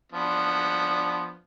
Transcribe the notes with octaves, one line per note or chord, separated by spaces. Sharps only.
F3 B3 D4